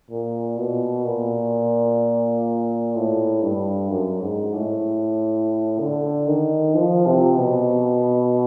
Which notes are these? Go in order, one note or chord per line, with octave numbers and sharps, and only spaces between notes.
A#2
B2
A#2
A2
G2
F#2
G#2
A2
D3
D#3
F3
C3
B2